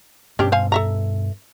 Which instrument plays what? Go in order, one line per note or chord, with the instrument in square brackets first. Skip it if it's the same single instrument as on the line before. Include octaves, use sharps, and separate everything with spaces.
[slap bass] G2 B2 [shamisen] C#4 D4 G4
[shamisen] C5 F5 G#5
A4 E5 A#5